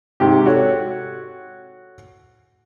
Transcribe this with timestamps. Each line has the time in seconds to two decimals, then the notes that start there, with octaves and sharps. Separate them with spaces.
0.20 G#2 C3 G4
0.46 F#4 A4 C#5